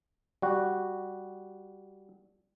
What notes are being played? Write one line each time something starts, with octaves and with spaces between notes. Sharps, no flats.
G3 F#4